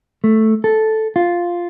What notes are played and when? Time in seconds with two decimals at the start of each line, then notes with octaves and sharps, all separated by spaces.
0.24 A3
0.64 A4
1.16 F4